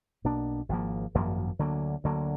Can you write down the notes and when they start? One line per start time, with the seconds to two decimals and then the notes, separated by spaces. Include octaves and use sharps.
0.24 B1 B2 A#3 D4
0.69 G#1 F#2 F3 A#3
1.14 G#1 F#2 F3 A#3
1.59 D2 D3 F#3 A#3
2.04 D2 D3 F#3 A#3